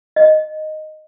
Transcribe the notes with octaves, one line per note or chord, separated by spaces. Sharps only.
D#5